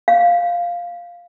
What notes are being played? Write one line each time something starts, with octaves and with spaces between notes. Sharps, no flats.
F5